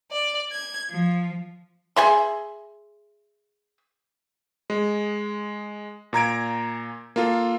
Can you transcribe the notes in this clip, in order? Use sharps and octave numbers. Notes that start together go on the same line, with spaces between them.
D5
G#6
F3
G#4 E5 C6
G#3
A#2 A#5 G#6 D7
A#3 F4 A4